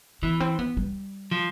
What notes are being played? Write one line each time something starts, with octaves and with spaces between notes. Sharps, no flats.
E3 B3
C4
B3
G3
F3